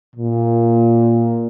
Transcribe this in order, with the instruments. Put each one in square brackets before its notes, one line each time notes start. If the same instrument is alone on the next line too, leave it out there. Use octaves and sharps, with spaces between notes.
[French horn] A#2